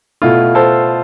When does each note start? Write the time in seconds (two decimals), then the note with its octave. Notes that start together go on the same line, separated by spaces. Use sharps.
0.22 B2 A3 E4 F4
0.55 A4 C5